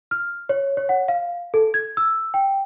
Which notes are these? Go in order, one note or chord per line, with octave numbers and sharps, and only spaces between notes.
F6
C#5
C#5
F#5
F5
A4
G#6
E6
G5